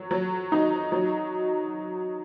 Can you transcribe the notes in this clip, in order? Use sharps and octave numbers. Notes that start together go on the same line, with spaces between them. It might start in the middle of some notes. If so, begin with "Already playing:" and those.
Already playing: F#3
F#3
D#4
F#3